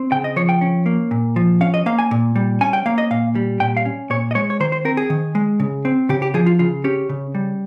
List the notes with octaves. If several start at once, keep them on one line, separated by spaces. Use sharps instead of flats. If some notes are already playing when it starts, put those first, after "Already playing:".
Already playing: C4
C#3 G5
D#5
F3 C#5
G5
C#4
A#3
A#2
F3
C#4 F5
D#5
A#3 F5
G#5
A#2
G3
C#4 G#5
G5
A#3 F5
D#5
A#2 F5
G3
A#2 G5
F5
C#4
A#2 C#5
D#5
G#3 C#5
C#5
D#3 C5
C5
C4 A#4
G#4
D#3
G#3
C#3
C4
C#3 G4
G4
F3 G#4
F4
C#3 F4
C#4 G4
C#3
G3